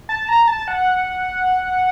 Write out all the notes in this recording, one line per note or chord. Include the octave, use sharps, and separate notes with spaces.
A5
A#5
A5
F#5